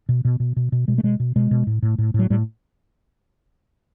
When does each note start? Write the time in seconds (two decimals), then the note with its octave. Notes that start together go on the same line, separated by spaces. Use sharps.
0.09 B2
0.25 B2
0.40 B2
0.56 B2
0.72 B2
0.88 B2 G#3
0.98 A3
1.03 B2 G#3
1.20 B2
1.36 B2 G#3
1.51 B2
1.67 A2
1.82 A2
1.98 A2
2.14 A2 F#3
2.30 A2 G3